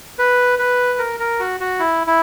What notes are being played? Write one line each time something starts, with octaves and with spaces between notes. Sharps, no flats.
B4
B4
A#4
A#4
F#4
F#4
E4
E4